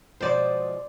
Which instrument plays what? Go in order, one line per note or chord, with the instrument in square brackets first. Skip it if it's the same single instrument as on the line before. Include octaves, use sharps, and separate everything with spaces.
[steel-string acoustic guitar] B2 F3 G#3 [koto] C5 D5